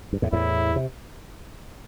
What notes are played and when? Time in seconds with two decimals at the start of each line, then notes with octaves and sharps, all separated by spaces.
0.13 G2
0.22 E2 A2
0.33 E2 A2 E4
0.76 C3